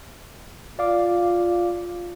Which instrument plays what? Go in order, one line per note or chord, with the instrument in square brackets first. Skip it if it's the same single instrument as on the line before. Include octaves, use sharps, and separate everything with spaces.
[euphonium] F4 [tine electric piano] D5 F5 D6